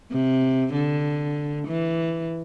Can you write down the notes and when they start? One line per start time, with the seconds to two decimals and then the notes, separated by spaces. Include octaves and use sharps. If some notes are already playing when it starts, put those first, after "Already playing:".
0.11 C3
0.73 D3
1.67 E3